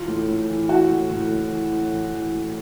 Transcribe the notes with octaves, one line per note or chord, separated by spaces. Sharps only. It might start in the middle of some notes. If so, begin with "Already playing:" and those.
Already playing: E3 F4
A2
A2
E3
E3 F#4
A2
A2
A2
E3
A2
E3
E3
A2